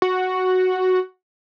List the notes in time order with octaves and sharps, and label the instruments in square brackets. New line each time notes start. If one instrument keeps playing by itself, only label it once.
[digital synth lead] F#4